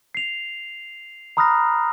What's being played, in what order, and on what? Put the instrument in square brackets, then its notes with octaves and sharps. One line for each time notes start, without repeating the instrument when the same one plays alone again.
[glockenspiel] C7 F7
A#5 B5 D#6 F6 F#6 A#6